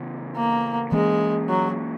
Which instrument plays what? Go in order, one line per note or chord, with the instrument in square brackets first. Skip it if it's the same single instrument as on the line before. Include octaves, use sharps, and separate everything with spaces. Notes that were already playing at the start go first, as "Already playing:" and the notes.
Already playing: [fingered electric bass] C#3 E3 B3
[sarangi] A#3
[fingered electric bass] E3 A#3 C#4 [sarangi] G#3
[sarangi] F#3